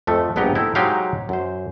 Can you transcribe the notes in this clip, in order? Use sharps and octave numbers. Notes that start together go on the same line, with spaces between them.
F2 F3 A3
A#1 G2 B3 G4 G5 A#5
A3 C4 D#4 E4
F#3 G#3 D#4 G4 C5 F5
F#2 C5